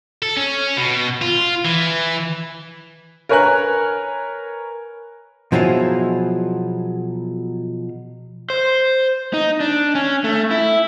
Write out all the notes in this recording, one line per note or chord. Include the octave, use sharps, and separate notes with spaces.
A4
C#4
B2
F4
E3
A#4 B4 C#5 G#5 A#5 F#6
B2 F3 F#3 E4 G#4 F5
C5
D#4
D4
C#4
A3
E4